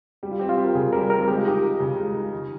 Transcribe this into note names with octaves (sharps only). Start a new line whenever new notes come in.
G3 G4
F4
C4 G4
F4
G4
A#4
C#3 G#4
G3 A#4
C4 A#4
G#3 G4
F4
D#4 G4
A#4
C#3
G#3
D#4
D#3